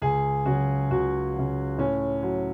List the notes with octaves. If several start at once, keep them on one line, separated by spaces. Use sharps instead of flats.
C#2 G#4
C#3 F#3 F#4
C#2 F#4
C#3 F#3
A2 C#4
F#3